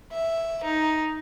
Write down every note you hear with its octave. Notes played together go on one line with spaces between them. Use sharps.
E5
D#4